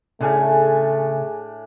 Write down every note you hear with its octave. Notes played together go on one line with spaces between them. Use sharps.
A2 C#3 A3 D4 G#4 G#5